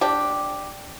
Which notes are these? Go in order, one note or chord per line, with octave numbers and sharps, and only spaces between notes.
D4 G4